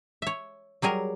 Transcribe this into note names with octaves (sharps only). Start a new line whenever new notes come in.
C#5 E5
F#3 G3 G#4 A#4